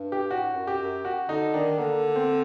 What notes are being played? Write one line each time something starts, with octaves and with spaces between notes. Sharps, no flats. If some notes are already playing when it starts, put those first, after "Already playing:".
Already playing: G2
G4
A2 F#4
F#2
G4
F#2
F#4
D3 D#4
D#3 D4
D3 A#3
C4